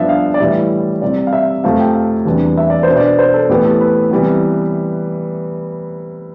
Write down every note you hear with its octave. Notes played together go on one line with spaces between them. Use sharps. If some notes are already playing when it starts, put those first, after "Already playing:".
Already playing: G2 F3 B3 D4 D5 E5
F5
D5
A2 E3 G3 E5
C3 G3 C4 D5
F5
E5
F2 C3 F3 A3 F5
G5
F5
E2 C3 E3 G3 D4
E5
D5
C5
B2 B3 D4
D5
C5
A4
A2 E3 B3 G4
A4
B4
C3 E3 G3 B3